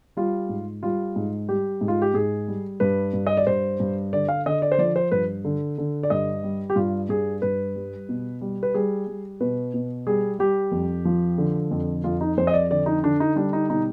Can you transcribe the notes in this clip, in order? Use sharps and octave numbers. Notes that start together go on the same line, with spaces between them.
G3 F4
G#2
G3 F4
G#2
G3 G4
G#2
F4
G4
G#2 G#4
G3
G2 B4
G2
D#5
D5
G2 C5
G2
D3 D5
F5
D3 D#5
D5
C5
F3 D5
C5
G2 B4
D3
D3
D5
G2 D#5
G3
G4
G2 F4
G2 G#4
G2 B4
G3
B2
G3
B4
G3 G#4
G3
B2 B4
B2
G3 G#4
G3 G4
F2
F3
D3
F2
F2 F4
D#4
F2 C5
D#5
D5
D3 D5
D#4
D3 D4
D#4
G3 D4
D#4
B2 D#4